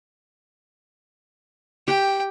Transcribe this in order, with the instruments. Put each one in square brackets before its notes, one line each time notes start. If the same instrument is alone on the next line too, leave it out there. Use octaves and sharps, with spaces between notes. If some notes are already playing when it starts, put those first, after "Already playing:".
[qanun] G4 [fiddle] G5